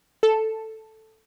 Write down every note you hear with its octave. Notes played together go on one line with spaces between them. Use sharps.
A4